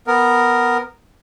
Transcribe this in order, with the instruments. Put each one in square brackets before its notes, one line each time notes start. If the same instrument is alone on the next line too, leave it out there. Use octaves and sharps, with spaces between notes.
[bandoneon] B3 A#4